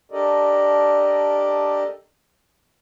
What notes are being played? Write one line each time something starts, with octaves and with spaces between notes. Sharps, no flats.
D4 G4 A4 A#4 D5 D#5